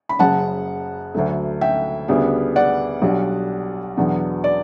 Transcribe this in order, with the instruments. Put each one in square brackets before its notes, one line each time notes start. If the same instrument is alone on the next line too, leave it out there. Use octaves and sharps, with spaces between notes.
[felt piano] B5
F#1 F#2 C#3 F#5 A5
D2 D3 F#3 A3
E5 G5
D2 C#3 G3 B3 D4
D5 F#5
B1 B2 G3 D4
E2 B2 F#3 B3 D4
D5